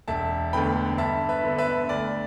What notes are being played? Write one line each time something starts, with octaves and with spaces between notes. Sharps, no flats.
E1 E5 A5
D2 D3 B3 G5 B5
G2 E5 A5
B4 E5
D3 B3
B4 E5
D2 D5